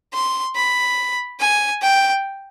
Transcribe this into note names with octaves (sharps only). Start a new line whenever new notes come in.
C6
B5
G#5
G5